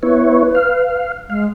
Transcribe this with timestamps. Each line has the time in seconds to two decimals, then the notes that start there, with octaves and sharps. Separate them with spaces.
0.03 B3 E4 B4 C#5
0.55 F5
1.30 G#3 F5